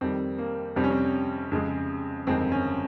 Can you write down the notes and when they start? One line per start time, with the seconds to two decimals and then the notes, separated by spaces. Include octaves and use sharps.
0.01 F2 D#3 G3 C4
0.39 A#3
0.76 F2 C3 G3 C4
0.84 C#4
0.90 C4
1.52 F2 C#3 G#3
2.26 G1 F2 D#3 G#3 C4
2.52 C#4